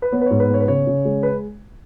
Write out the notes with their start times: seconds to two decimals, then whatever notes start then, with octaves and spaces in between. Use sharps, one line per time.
0.02 B4
0.12 B3 C#5
0.21 B4
0.26 G#2 C#5
0.40 B4
0.50 B3 C#5
0.60 B4
0.68 C#3 C#5
0.87 C#3
1.05 G#3
1.23 B4